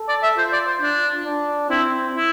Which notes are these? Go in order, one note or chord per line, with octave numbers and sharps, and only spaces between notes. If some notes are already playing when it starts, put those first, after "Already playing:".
Already playing: A4
D5
E5
F4 C5
D5
C5
D4
D4
C4 E4
E4